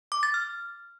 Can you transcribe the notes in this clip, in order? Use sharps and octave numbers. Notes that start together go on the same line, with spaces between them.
D6
A6
F6